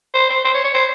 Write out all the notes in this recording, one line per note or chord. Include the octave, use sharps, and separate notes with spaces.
C5
C5
C5
C#5
C#5
C5